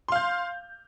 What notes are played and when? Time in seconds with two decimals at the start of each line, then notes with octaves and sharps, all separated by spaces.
0.08 C6
0.12 F5
0.16 G6